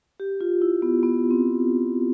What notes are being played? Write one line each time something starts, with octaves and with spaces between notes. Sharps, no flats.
G4
F4
E4
B3
B3
C4